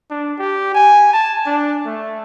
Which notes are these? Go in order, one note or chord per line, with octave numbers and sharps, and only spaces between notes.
D4
G4
G#5
A5
D4
A3